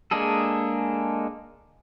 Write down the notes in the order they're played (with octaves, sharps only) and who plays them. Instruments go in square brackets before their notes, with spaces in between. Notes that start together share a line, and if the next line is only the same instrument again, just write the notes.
[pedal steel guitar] G#3 A#3 D4 G#4 A4